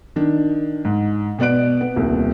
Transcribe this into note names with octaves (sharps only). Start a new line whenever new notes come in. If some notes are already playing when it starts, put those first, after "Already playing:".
D#3 D4
G#2
B2 B3 D5 F#6 D7
B3
D#1 C2